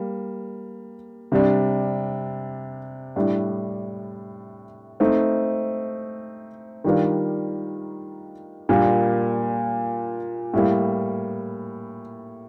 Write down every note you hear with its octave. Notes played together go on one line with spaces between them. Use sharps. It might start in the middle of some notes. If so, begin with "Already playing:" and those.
Already playing: G3 A#3
C3 G3 D4
A2 G3 D4
A3 C4 D#4
D#3 G3 D4 F4 A#4
A#2 G3 A#3 D4
A2 G3 A#3